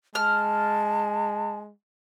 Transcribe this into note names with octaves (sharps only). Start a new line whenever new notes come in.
G#3 A5 F6